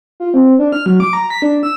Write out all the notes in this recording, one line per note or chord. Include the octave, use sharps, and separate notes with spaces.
F4
C4
D4
F6
F#3
D6
A#5
B6
D4
E6